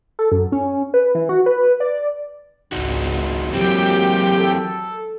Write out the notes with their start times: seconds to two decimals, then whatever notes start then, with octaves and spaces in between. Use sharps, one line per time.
0.19 A4
0.32 F#2
0.52 C#4
0.94 B4
1.15 E3
1.29 F#4
1.46 B4
1.80 D5
2.72 G#1 C#2 D4 D#4 F#4
3.53 E3 F#3 G#3 A#3 C4 G4 G5
4.38 A4